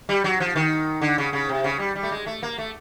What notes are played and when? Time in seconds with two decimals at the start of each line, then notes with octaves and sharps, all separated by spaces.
0.09 G3
0.24 F#3
0.40 F3
0.56 D#3
1.02 D3
1.18 C#3
1.33 C#3
1.49 C3
1.64 C#3
1.79 G3
1.95 G3
2.03 A3
2.12 G#3
2.26 A3
2.43 A#3
2.58 A3